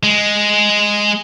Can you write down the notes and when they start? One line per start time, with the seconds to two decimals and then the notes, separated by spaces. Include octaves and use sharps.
0.03 G#3